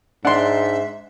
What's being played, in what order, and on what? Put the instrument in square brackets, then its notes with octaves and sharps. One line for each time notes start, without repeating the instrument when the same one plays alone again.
[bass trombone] G#2 [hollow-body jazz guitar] D4 [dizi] E5 [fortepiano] F#5 C6